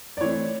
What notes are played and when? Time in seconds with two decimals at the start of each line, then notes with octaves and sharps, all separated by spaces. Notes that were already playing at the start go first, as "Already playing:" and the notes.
0.17 D5
0.21 E3 A3 C4 C#5